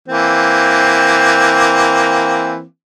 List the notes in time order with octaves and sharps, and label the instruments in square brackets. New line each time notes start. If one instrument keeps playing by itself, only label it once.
[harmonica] E3 A#3 C4